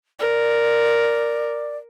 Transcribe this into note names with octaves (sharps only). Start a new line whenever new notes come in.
A#4 D5